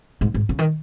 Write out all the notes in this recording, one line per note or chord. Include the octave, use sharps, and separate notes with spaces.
G#2
G#2
C#3
D#3